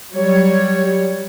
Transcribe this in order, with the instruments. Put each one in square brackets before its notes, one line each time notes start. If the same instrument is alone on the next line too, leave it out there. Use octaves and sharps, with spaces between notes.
[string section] F#3 G3 C#5